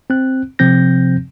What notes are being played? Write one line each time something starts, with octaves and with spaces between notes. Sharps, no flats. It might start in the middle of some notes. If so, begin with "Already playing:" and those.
C4 F#6
C3 F3 C4 G6 A#6